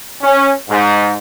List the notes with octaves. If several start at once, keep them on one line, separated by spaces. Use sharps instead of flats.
C#4
G#2